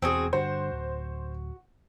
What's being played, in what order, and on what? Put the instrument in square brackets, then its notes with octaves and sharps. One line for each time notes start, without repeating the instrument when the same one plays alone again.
[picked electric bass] E1 E2 [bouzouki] C4 F#4 G#4
[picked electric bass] G2 D3 [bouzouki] F#4 [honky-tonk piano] C5
[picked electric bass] D1